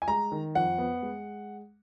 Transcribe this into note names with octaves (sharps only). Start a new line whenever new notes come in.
G#5
G#3 A#5
D#3
F2 F#5
B3
G#3